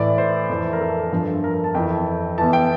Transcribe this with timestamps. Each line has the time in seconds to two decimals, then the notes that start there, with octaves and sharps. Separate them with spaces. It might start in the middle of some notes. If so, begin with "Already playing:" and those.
Already playing: A2 E3 D5
0.18 C5
0.49 F2 E3
0.73 A#4
0.81 A4
1.12 G2 F3
1.44 A#4
1.54 A#4
1.64 A5
1.75 F2 E3 G5
2.38 E2 E3 A5
2.53 G5